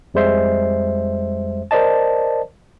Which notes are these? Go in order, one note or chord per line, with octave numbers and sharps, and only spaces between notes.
F2 G3 G#3 C5 E5 C7
A#4 C5 D5 D#5 A5